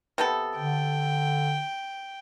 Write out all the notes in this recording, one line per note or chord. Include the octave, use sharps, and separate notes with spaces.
C3 B3 A4
D3 G5